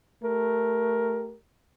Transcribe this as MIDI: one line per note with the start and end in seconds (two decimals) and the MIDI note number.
0.23 1.36 57
0.23 1.36 67
0.23 1.36 70